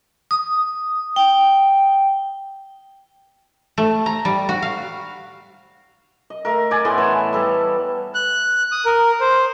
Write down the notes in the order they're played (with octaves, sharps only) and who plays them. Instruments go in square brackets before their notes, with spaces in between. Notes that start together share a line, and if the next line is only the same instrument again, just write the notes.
[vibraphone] D#6
G5
[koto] A3
A#5
G3
F#4
F5
[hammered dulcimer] D#5
A3 A#4
D5 G#5
A2 B3 G#5 C6
E3 C#5 A5
G3 A4
[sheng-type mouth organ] F#6
D#6
A#4
C5